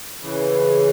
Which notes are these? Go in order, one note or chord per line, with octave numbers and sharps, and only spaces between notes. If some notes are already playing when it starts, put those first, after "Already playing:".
C#3 E3